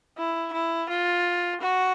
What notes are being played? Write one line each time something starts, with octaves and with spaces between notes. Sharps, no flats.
E4
E4
F4
F#4